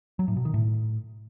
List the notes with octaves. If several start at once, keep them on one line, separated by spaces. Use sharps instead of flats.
F#3
A2
B2
D#3
A2